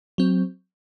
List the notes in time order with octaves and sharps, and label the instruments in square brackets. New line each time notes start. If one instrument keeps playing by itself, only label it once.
[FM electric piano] F#3 C4